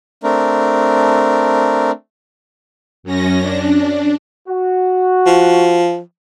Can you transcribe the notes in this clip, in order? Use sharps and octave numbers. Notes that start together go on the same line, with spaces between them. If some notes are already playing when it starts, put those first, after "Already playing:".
A3 C4 D4 A#4
F#2 C#4 A#6
D4
F#4
F3